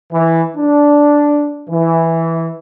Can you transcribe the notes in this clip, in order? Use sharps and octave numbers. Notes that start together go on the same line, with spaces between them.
E3
D4
E3